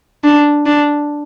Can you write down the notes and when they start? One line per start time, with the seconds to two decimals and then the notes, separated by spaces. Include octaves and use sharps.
0.24 D4
0.66 D4